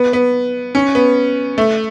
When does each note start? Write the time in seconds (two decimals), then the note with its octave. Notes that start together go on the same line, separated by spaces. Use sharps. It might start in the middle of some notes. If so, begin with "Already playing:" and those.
Already playing: B3
0.13 B3
0.75 C#4
0.95 B3
1.58 A3